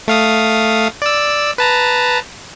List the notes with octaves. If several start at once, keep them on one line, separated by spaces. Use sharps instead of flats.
A3 F5 D#6
D5 E6
B4 A5 A#5